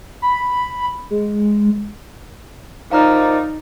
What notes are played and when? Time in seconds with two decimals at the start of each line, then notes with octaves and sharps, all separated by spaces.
0.22 B5
1.10 G#3
2.92 D#3 F3 D#4 D5 F5 A#5 F6